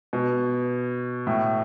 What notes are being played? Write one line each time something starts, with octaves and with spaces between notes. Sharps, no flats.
B2
A2